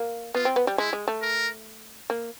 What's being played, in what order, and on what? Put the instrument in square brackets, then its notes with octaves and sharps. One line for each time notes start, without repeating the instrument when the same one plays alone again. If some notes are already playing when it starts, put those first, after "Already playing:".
Already playing: [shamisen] A#3
[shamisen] B3 [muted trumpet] F4
[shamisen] C4
B3
G3
[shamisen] G#3 [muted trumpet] E4
[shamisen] G#3
A3
[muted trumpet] A#4
[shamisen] A#3